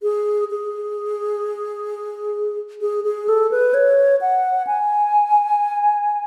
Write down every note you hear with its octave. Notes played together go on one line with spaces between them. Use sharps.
G#4
G#4
G#4
G#4
A4
B4
C#5
F#5
G#5